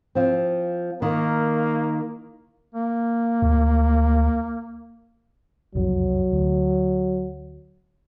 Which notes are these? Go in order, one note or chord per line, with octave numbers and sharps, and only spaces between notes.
F3 C4
D#3 A#3
A#3
D2
F#1 C2 F2 F#3
D2